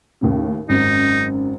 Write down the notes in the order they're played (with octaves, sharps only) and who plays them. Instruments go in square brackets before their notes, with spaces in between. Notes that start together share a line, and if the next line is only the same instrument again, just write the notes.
[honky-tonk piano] D#2 A2 C#3
[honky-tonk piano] G#1 F#2 [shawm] D#4